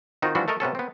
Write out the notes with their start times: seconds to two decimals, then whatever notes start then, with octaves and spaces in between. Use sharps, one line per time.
0.22 D#3 C4 D#4 F4 F#4
0.35 E3 F3 G3 D4 E4 F#4
0.48 A3 A4 A#4 D#5
0.60 C3 B3 C#4 A4
0.75 B3 C4